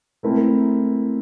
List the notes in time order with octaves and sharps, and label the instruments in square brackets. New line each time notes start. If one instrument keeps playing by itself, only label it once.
[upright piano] A3 C4 E4 A#4